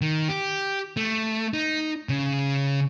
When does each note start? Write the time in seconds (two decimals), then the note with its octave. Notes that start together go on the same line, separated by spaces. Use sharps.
0.01 D#3
0.29 G4
0.97 A3
1.53 D#4
2.09 C#3